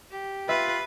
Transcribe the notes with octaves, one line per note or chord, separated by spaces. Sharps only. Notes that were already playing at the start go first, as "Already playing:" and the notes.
G4
F4 B4 E5